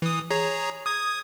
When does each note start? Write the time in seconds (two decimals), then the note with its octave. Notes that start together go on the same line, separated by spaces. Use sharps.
0.02 E3 D#6
0.30 G#4 C#5 A#5
0.86 D#6 G#6